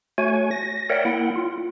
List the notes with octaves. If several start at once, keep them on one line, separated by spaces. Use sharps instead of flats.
A3 F#4 C#5 G#5
A#6
A#4 C#5 D5 E5 F#5 G5
A#3 E4 F#5 G5
F4